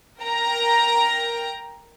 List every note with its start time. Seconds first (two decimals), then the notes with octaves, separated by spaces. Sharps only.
0.20 A#4 G5 A#5